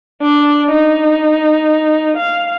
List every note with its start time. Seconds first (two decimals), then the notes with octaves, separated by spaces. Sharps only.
0.21 D4
0.71 D#4
2.17 F5